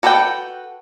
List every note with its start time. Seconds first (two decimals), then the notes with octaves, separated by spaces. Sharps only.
0.03 F#4 A4 B4 D#5 G5